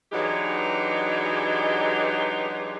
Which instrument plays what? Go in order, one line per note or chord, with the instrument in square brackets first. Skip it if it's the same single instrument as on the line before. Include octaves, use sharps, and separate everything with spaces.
[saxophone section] E3 F#3 G#3 D4 D#4 G4